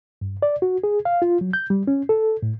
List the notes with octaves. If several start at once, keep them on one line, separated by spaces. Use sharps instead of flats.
G2
D5
F#4
G#4
F5
F4
F#3
G6
G3
C#4
A4
A2